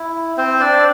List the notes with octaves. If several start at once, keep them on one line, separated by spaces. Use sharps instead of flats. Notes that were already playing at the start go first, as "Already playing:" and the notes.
Already playing: E4
C4 C5
D4 D5